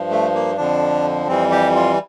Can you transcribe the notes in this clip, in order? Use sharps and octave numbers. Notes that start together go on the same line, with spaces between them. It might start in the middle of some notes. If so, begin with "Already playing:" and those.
Already playing: G2 F3
A3
A#3
F2 D3 F3 D4
F2 E3 G3 C4
G4
F4